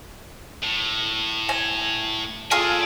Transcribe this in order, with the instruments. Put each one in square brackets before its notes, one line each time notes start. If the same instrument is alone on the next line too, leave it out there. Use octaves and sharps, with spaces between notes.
[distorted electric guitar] A2
[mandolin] G#5
[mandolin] F4 G#4 A4 [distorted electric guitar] D5 G#5